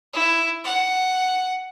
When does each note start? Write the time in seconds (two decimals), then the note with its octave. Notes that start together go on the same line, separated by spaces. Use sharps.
0.13 E4
0.64 F#5